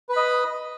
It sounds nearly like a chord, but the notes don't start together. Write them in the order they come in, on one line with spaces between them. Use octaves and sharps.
B4 B5 D#5